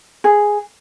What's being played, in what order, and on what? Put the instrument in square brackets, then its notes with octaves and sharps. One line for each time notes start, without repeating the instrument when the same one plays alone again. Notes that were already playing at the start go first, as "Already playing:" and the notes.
[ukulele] G#4